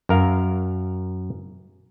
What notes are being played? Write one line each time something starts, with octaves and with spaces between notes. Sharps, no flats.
F#2 A#4 F5